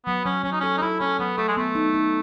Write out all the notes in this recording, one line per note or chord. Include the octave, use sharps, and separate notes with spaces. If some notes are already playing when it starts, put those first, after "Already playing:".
F#3 B3
F#3 C#4
F#3 C#4
D#4
C#4 A4
D#4
E4 A4
C#4 A4
F#3 B3
A3 A4
G#3
A3 B3
D#4
D#4